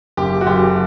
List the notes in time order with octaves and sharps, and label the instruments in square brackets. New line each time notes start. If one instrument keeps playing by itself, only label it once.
[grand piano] F#1 G4
F#4
F#1 G4